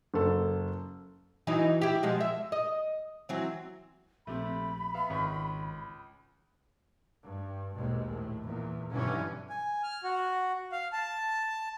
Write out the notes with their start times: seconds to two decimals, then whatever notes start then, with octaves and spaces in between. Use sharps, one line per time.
0.14 F#1 A4
1.47 E3 F#3 D#4
1.82 E4 G4
2.03 B2 F3 G#3
2.21 E5
2.52 D#5
3.29 E3 F#3 C4
4.27 A#1 C3 A3 B5
4.94 B3 E5 F5
5.10 G#1 C#2 C#6
7.23 G2
7.75 A#1 D#2 B2 G#3
8.10 A2
8.42 E2 A#2
8.92 B1 G2 D3 E3 C#4
9.50 G#5
9.83 F6
10.04 F#4
10.72 F5
10.93 A5